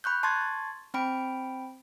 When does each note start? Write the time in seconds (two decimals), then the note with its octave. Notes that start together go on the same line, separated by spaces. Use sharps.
0.04 B5 C#6 F#6 G6
0.23 A5 C6 C#6 G#6 A6
0.94 C4 G5 B5 D7